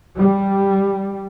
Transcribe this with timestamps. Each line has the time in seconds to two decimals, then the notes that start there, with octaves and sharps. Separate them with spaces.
0.16 G3